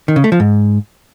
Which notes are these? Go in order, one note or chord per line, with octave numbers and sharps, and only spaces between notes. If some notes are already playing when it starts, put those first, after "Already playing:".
D#3
C#3
A3
F3
G#2